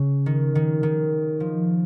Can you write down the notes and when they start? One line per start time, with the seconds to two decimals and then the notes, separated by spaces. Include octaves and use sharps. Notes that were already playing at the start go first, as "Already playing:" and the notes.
Already playing: C#3
0.26 D#3
0.55 D#3
0.83 D#3
1.40 F3